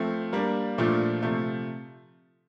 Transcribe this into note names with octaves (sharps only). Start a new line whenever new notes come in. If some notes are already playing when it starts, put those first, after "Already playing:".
Already playing: F3 A3 C4
G3 A#3 D4
A#2 F3 A3 D4 F4
C3 F3 A3